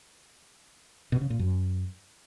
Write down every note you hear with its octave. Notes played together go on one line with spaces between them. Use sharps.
B2
C#3
A#2
F#2